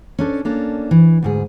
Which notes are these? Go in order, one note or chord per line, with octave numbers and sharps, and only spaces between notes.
C#4 D4 A4
A#3 C#4 D4 A4
E3
D2 G#2 G#4